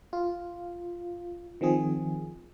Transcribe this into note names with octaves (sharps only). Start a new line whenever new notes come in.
F4
D#3 F3 C4 G#4